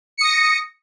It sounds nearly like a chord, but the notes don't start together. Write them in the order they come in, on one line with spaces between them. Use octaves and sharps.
C#7 D#6 A#6